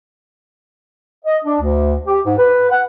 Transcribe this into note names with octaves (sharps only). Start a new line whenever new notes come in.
D#5
D4
D2
G4
G#2
B4
F#5